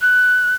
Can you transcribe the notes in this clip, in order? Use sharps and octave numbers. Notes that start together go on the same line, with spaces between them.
F#6